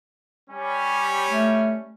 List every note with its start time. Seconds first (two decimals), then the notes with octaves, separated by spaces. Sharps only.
0.50 G3 C#4
1.30 A3